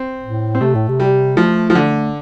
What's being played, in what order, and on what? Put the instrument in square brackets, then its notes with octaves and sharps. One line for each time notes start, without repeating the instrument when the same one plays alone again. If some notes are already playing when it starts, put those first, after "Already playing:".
Already playing: [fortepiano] C4
[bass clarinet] A2
[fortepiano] C4
[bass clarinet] C3 [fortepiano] A3
[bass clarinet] A2
C3
[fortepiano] G3
[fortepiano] F3 [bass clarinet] A3
[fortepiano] F3
[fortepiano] D3 [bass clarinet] A3